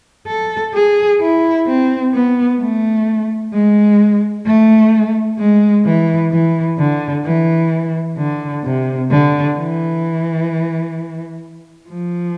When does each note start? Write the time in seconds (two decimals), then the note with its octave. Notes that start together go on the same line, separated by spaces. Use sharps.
0.27 A4
0.74 G#4
1.21 E4
1.67 C4
2.13 B3
2.60 A3
3.53 G#3
4.46 A3
5.39 G#3
5.85 E3
6.32 E3
6.79 D3
7.24 E3
8.17 D3
8.64 C3
9.11 D3
9.58 E3
11.89 F3